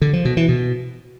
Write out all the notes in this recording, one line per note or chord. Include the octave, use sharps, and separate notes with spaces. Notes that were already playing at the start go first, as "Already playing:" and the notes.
D3
F3
B2
E3
B2